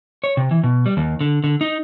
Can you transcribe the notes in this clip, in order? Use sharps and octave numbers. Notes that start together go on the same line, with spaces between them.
C#5
C3
E3
B2
G3
D#2
D3
D3
D#4